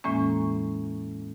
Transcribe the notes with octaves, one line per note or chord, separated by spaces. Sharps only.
E2 A2 E3 G#3 A#3 C#4